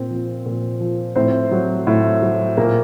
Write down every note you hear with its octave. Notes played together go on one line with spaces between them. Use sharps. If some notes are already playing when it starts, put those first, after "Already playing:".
Already playing: A#2 C4 C5
F3
A#2
F3
A2 C4 C5
F#3
A2
F#3
A#2 A#3 A#4